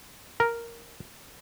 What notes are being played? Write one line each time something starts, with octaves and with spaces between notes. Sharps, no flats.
A#4